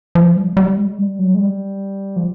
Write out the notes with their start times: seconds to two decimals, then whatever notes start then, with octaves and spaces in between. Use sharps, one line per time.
0.15 F3
0.37 G3
0.57 G3
0.78 G#3
0.99 G3
1.19 F#3
1.35 G#3
1.41 G3
2.16 F3